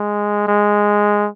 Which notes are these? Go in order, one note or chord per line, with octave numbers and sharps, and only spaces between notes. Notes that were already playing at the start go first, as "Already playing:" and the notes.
Already playing: G#3
G#3